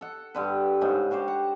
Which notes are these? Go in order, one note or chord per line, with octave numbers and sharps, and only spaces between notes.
A4 F#5
G2 D3 B4
G#2 C#3
D4 F#4 G4 C5
F#5